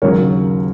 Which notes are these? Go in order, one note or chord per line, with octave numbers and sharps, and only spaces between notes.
D#2 C#3 F#3 A#4 C#5